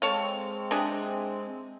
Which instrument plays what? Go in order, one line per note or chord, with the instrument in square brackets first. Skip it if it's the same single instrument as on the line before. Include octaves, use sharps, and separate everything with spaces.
[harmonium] G#3 C4 [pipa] A4 C#5 F5
[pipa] C3 D4 G#4